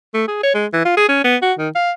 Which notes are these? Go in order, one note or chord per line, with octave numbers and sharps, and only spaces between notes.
A3
G#4
C#5
G#3
E3
F4
G#4
C#4
B3
F#4
D#3
F5